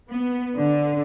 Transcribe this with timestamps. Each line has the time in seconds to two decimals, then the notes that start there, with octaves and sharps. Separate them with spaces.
0.10 B3
0.56 D3